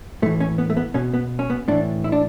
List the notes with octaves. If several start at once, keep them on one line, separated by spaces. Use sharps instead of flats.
A2 E3 A3
C#4
B3
A3
B3
B2 C#4
B3
C#4
B3
A2 E3 D4
E4
D4